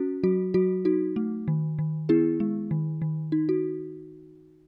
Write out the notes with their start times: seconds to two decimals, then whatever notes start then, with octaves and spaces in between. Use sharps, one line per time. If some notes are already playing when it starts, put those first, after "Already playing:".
Already playing: C#4 F#4
0.23 F#3 F#4
0.54 F#3 F#4
0.85 D#4 F#4
1.16 A3
1.48 D#3
1.79 D#3
2.09 B3 E4 G#4
2.40 G#3
2.71 D#3
3.02 D#3
3.32 D#4
3.49 F#4